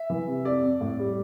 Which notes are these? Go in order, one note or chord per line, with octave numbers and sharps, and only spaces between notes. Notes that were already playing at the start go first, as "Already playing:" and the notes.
Already playing: E5
E3
C3
F2 D5
F2
A2
G3